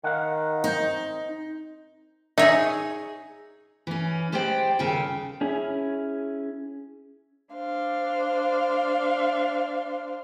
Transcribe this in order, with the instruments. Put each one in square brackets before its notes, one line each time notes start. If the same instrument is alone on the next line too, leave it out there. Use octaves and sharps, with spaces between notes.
[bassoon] D#3 [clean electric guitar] A#4 F5 F#5
[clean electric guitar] C4 C5 [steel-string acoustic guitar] D#4
[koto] D#4 C#5 [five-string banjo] G#4 E5
[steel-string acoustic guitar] E3 C#4
G#3 G4 C5 D5 G5
D#2 C#3 G3 A4 G5
[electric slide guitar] C#4 E4 G#4
[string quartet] D4 C5 F5